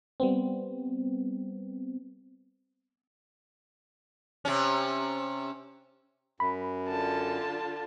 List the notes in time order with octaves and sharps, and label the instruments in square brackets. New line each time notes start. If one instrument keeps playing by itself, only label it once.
[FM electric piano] G3 B3 C4
[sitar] C3 C#4
[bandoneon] F#2 [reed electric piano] B5
[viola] D3 F4 [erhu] A5